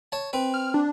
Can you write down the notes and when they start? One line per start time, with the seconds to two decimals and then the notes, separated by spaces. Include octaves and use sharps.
0.12 C#5 A5
0.33 C4 B4
0.54 F6
0.74 D4